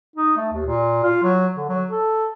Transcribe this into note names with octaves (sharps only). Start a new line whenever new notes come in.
D#4
A3
D#2
A#2
F4
F#3
D3
F#3
A4